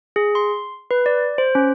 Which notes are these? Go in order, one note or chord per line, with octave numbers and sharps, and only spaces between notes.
G#4
C6
B4
D5
C5
C#4